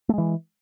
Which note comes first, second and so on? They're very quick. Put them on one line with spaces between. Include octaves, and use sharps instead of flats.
A3 G#3 E3